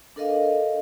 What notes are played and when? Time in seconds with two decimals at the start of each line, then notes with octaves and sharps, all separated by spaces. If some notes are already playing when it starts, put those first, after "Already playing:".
0.16 D4 A4 A#4 D#5 F5